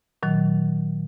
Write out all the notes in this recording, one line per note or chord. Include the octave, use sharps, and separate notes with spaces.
A#2 D#3 F#3